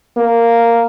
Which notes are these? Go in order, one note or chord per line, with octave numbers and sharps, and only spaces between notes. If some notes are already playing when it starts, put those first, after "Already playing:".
A#3